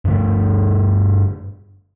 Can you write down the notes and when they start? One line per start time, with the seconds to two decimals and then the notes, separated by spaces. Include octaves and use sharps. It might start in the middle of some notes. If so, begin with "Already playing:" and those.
0.05 G2 D3 A3